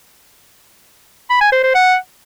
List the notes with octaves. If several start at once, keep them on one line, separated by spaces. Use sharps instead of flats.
B5
G#5
C5
C5
F#5